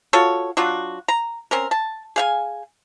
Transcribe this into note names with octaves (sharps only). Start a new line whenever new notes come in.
F4 F#4 A4 C#5
F#3 D4 F4 F#4
A#5
C4 C#4 A#4
A5
G#4 F5 G#5